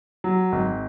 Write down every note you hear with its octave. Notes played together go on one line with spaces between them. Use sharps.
F#3
G#1